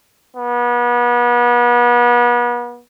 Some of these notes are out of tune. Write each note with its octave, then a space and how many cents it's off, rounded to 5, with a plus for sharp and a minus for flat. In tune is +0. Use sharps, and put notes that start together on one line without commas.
B3 -35